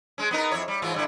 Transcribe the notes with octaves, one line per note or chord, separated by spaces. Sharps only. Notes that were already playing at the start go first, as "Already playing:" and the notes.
G#3 C#4
B3 D#4 A#4
F2 E4 C#5
G3
G#2 E3 F4
G2 D3 E4